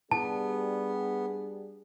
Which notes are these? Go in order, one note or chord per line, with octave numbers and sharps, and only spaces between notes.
G3 B3 D4 G#4 A5